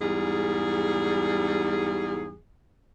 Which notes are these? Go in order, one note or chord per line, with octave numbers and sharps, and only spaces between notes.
E2 G#2 G3 G#4